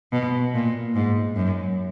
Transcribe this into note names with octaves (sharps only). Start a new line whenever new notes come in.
B2
A#2
G#2
F#2